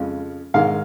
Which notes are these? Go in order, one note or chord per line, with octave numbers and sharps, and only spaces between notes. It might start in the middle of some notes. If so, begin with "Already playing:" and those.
Already playing: F2 C#3 F3 G#3
G#2 D#3 G#3 F5